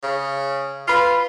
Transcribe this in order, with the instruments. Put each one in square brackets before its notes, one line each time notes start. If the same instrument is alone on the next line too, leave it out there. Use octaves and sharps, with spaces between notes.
[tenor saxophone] C#3
[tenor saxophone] F4 [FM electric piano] B4 F5